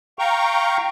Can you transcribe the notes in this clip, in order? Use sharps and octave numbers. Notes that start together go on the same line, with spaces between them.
F5 G5 A#5 C#6